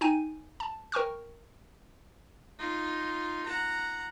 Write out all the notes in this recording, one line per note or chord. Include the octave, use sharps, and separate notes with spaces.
D#4 G5 G#5 D#7
A5
A#4 G5 C#6 F6
D#4 F4
F#5 A#5